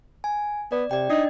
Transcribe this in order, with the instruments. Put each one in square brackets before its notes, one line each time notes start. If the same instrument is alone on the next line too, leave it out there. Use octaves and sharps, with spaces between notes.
[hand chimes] G#5
[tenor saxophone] B3 [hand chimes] D5
[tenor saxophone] C3 [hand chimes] D5 G5
[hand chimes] D4 D#5 [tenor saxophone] D#4